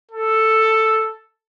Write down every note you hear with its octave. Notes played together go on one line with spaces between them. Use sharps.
A4